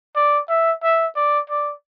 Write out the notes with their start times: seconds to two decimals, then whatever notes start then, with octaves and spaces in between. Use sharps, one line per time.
0.16 D5
0.49 E5
0.83 E5
1.16 D5
1.50 D5